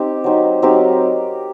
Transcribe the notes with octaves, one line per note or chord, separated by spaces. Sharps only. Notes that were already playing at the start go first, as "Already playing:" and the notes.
Already playing: C4 D#4 G4
F#3 C4 D#4
F#3 C4 D#4 G4 A#4